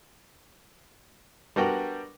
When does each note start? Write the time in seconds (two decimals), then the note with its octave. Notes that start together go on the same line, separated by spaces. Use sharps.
1.56 G3 B3 D4 F#4 A#4 G5